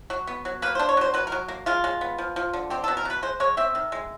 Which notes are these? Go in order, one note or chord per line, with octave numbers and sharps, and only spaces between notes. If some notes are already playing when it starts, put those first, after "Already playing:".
F#3
B3
F#3
A#3 B4
D4 C5
C#5
F#3 C5
F#3 B4
A#4
F#3
A#3
G#3 F4
G#3
B3
F3
F3
D3
C4 G4
B2 A4
A#4
B2 B4
G#3 C5
G#3 C#5
C4 E5
D#3
G#3